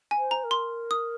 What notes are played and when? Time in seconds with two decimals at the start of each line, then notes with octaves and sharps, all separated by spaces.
0.11 G#5
0.18 C5
0.31 A#5
0.44 A#4
0.51 C6
0.91 D#6